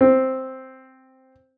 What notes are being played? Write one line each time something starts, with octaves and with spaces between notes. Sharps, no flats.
C4